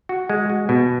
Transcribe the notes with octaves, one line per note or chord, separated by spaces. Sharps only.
F#4
G#3
F#4
B2